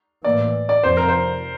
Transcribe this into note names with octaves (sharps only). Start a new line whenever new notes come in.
A2 E3 A#3 D5
D5
F2 C3 F3 C4 C5
A#4
C5